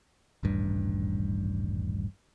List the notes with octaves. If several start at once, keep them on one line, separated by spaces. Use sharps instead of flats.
D#1 A1 G2